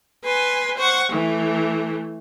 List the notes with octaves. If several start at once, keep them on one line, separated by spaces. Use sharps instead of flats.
B4 G#5 C6
C5 F#5 C#6
E3 A3